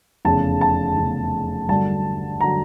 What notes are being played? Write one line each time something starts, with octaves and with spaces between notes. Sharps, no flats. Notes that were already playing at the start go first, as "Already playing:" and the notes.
F1 E2 C#3 A5
A5
F1 E2 C#3
G1 G2 D3 F#3 A5
D3 F#3 A#5